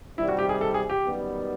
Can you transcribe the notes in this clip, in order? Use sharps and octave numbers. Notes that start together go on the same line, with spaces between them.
C3 D#3 G3 E4
F#4
G4
G#4
A4
G#4
G4
F#2 D#3 G3 B3